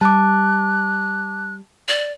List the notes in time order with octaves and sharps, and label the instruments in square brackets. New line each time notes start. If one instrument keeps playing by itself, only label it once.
[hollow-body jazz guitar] G3 [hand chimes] A5 D6 [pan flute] F#6
[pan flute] D5